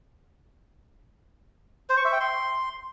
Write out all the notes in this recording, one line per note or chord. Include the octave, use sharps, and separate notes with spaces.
C5
C#6
E5
G5
C6